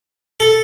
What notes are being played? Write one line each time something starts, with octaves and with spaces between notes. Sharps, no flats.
A4